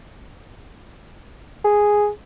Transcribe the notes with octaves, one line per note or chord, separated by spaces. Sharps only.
G#4